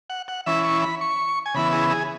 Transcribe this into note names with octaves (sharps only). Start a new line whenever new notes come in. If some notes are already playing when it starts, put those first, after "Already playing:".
F#5
F#5
E3 C#4 E4 E5
C#6
B5
C#6
G#5
C#3 E3 B3 E4 B5
G#4
G#4